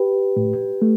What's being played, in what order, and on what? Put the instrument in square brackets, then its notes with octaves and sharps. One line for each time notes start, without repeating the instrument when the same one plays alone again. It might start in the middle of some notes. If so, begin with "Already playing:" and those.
Already playing: [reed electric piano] G4 B4
A2
A3